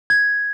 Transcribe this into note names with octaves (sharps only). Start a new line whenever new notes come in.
G#6